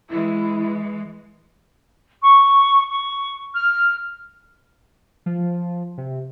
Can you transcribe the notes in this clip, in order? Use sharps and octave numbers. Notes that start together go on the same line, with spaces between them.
E3 G#3 E4
C#6
C#6
F6
F3
C3